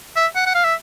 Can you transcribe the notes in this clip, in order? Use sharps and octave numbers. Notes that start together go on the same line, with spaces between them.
E5
F#5
F#5
F5
E5